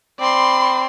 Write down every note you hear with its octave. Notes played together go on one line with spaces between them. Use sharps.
C4 D5 B5 C6